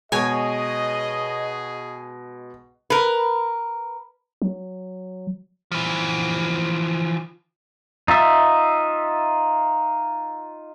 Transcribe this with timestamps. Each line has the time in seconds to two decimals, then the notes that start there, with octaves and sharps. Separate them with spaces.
0.12 B2 G#3 G#4 C#5 D#5 G#5
2.90 A#4 B4
4.42 F#3
5.72 E3 F3
8.08 D#4 F4 E5